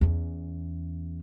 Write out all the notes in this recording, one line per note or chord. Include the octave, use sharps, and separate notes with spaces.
E2 C#4